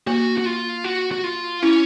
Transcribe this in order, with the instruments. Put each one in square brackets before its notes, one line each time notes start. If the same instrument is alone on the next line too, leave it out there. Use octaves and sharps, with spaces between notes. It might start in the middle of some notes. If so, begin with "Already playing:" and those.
[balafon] A#3 [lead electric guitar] F#4
[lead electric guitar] F#4
F4
F#4
F#4
F4
[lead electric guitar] C#4 [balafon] E4